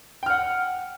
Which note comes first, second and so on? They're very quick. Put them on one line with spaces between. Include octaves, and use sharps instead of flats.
G5 F6 F#5